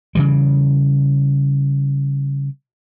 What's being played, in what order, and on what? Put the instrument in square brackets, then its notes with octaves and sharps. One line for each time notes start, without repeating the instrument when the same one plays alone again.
[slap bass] C#3 E3 G3